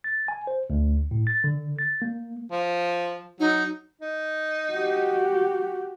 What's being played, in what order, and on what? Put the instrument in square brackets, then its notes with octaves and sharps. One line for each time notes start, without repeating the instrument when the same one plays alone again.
[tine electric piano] A6
G#5
C5
D2
A2
A6
D3
A6
A#3
[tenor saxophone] F3
[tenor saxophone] F#3 [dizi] D#4
[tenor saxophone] D#4
[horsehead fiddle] F#4 G4